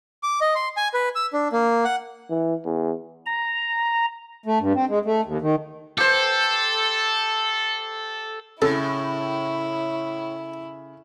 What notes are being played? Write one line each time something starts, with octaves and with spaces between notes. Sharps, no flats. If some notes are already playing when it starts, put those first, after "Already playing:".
D6
D#5
C6
G#5
B4
E6
D4
A#3
F#5
E3
E2
A#5
A3
G2
C4
G#3
A3
D#2
D#3
G4 A4 C5
A2 C#3 E4 A4